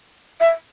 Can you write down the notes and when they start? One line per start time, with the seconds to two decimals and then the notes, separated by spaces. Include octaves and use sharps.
0.41 E5